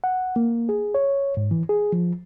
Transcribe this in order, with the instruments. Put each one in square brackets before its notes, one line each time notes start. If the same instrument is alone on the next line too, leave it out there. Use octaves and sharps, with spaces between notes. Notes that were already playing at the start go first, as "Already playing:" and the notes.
[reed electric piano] F#5
A#3
G#4
C#5
G#2
E3
G#4
F3